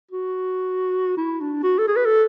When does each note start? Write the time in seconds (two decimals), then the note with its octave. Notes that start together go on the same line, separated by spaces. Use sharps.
0.11 F#4
1.17 E4
1.40 D4
1.63 F#4
1.78 A4
1.87 G#4
1.96 B4
2.05 A4